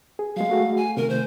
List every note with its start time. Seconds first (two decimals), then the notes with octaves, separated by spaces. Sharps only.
0.19 G#4
0.36 F#3 G#3 F5
0.50 A3 F#4 G#4
0.77 G#5
0.97 C3 D#3 A3 A#4
1.10 C5